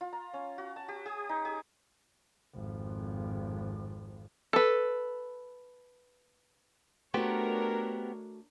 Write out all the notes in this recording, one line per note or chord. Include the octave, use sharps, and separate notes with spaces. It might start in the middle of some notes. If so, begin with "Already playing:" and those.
F4
A#5
C#4
F#4
A5
G4
G4
D#4
G4
G#1 F2
A4 B4
A3 B3 D4 F#4 G4 A#4 C5 C#5